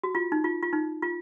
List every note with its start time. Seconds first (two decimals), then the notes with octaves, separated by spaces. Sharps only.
0.04 F#4
0.15 F4
0.32 D#4
0.44 F4
0.63 F4
0.73 D#4
1.02 F4